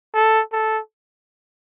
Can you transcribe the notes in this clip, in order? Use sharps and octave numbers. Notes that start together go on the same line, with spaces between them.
A4
A4